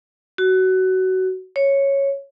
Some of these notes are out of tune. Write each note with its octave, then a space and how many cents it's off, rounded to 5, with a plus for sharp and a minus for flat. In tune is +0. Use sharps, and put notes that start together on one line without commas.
F#4 +20
C#5 -5